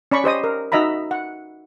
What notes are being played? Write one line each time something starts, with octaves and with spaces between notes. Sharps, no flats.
C#4 D5 B5 C#6
G4 C5 D#5 D#6
A#4
D#4 F#4 D#5 E5 A#5 B5
F#5